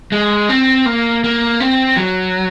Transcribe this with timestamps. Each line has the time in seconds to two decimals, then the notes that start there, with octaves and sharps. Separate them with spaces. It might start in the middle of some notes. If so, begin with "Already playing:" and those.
0.12 G#3
0.49 C4
0.86 A#3
1.24 A#3
1.60 C4
1.97 F#3